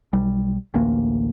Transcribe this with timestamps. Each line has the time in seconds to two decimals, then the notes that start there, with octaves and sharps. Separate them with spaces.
0.13 B1 G3
0.74 A1 D2 A#3